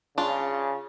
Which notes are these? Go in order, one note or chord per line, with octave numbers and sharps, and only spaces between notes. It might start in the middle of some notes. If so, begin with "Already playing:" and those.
C#3 D4 F4